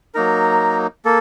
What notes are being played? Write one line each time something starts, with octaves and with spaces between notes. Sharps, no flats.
F#3 A#3 D#4 A#4
A#3 A4